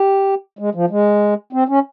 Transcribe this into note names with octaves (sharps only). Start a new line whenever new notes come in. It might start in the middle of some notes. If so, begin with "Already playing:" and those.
Already playing: G4
G#3
F3
G#3
C4
C#4